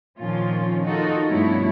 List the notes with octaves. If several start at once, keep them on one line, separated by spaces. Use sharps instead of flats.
A#2 D#3 F3 C#4 F4
D#4 F4 F#4 A4 A#4
G2 B2 F3 A3 E4 C#5